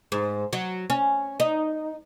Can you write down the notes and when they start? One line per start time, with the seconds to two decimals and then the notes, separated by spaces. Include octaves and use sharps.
0.12 G#2
0.53 F#3
0.90 C#4
1.40 D#4